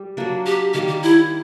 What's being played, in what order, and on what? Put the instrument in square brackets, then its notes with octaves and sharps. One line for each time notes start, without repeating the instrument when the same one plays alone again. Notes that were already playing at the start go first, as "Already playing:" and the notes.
Already playing: [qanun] G3
F#3 A#3 D4
[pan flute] G4
[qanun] D#3 G3 A#3 [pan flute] G4
[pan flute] G4
E4